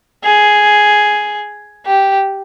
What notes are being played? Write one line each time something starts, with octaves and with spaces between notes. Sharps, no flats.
G#4
G4